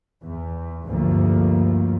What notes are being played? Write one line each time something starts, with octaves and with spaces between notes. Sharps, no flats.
E2
D2 G2 F3 A#3